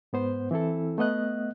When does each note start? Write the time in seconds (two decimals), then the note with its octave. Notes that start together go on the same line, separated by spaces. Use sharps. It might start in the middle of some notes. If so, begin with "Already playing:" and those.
0.13 G#2 B3 C5
0.51 E3 C4 E4 A4
0.98 A3 B3 D#5 F#6